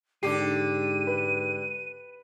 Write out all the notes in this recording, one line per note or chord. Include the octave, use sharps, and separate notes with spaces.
G#2 D3 G4 D6 C7 D#7
B4